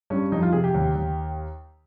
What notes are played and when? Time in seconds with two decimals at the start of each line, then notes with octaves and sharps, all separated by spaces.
0.10 G2 C#4
0.32 F2 D#4
0.43 F4
0.53 C3 G#4
0.64 G4
0.74 D#2
0.95 D#2